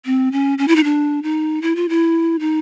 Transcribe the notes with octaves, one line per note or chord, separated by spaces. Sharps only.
C4
C#4
C#4
E4
D#4
D4
D#4
E4
F4
E4
D#4